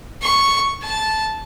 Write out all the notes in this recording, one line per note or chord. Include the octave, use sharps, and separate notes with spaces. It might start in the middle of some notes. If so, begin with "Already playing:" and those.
C#6
A5